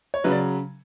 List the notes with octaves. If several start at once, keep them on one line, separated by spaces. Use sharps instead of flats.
C#5
C#3 F#3 B4
D5